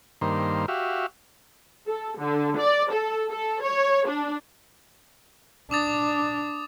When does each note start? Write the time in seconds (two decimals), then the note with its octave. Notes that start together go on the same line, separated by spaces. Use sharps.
0.21 G2 D#3 A#3 C5
0.68 F#4 G4 E5 F5
1.87 A4
2.19 D3
2.59 D5
2.92 A4
3.30 A4
3.64 C#5
4.08 D4
5.71 D4 D6 D#6 A6